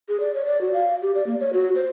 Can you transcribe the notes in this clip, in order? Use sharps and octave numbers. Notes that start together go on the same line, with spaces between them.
G#4
D5
C#5
D5
F#4
F5
G4
D5
A#3
C#5
F#4
C5